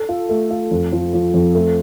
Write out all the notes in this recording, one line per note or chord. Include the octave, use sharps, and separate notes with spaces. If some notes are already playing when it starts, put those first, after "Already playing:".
Already playing: A4
F4
A3
F4
F2
F3
F3
F2
A3